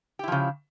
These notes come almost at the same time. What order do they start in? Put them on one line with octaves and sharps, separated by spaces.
G4 E4 F3 C#3